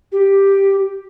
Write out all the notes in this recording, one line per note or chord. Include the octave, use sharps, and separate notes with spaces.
G4